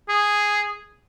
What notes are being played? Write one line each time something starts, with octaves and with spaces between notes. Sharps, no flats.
G#4